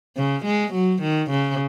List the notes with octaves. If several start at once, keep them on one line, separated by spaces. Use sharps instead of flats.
C#3
G#3
F#3
D#3
C#3